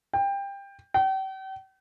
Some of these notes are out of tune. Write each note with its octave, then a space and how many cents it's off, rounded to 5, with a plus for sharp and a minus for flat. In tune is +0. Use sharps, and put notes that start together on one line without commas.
G5 +20
G5 -40